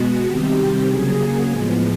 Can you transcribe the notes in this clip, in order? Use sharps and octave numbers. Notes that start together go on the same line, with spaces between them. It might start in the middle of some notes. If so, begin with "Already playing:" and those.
Already playing: B2 G#3 B3 F#4
C3 D#3 G3 C4 G4
C#3 F#3 A#3 G#4
A2 F3 G#3 B3